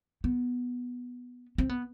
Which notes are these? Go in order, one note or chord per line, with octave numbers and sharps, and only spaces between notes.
B3
C4
B3